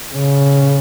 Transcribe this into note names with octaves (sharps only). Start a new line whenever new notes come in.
C#3